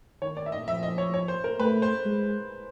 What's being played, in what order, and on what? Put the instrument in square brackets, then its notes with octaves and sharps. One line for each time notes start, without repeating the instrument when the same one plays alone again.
[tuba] D#3 [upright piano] C#5
[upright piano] D5
E5
D#5
[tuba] F3 [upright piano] E5
[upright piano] D#5
C#5
C#5
C5
A#4
[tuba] A3 [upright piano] B4
[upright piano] C5
[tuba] G#3